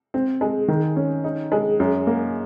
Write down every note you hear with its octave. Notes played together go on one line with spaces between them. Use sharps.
C4
G#3
D#3
C#4
D#4
G#3
F#2
A#3